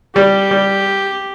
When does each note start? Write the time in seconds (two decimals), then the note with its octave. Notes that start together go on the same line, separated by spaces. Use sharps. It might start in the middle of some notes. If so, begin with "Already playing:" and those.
0.15 G3 G4
0.51 G3